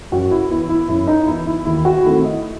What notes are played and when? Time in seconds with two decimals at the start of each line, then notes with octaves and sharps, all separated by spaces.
0.12 F#2 F#4
0.31 E4
0.50 E3 B3 E4
0.69 E4
0.89 F#2 E4
1.08 D#4
1.27 E3 B3 E4
1.47 E4
1.65 D#2 E4
1.85 F#4
2.04 D#3 A3 C4 E4
2.24 D#5